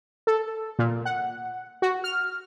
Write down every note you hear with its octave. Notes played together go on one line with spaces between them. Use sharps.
A4
A#2
F#5
F#4
F6